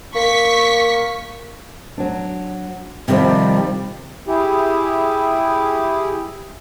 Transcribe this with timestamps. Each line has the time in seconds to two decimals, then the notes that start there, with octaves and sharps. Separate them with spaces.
0.15 A#3 C#6 B6
1.98 F#3 D4
3.08 C3 D#3 F3 G3
4.28 E4 G4 G#4